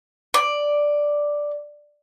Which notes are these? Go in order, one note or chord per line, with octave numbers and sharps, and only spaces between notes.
D5